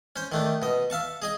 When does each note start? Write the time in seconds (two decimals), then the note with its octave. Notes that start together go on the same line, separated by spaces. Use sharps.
0.16 C#4 C5
0.32 D#3 A3 D4
0.62 B2 D#5
0.90 E5 F5 A5 C#6
1.22 G#4 D#5 G#5